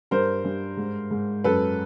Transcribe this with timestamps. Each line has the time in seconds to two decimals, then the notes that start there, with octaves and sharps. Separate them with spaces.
0.11 G2 A#4 C5
0.45 G2
0.77 G#2
1.11 G#2
1.44 F#2 A4 B4